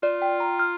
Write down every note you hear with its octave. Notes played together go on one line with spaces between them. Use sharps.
F4 D5
G5
A#5
F6